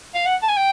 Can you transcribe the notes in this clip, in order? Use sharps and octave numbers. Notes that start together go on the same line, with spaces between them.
F5
F#5
A5
G#5
G5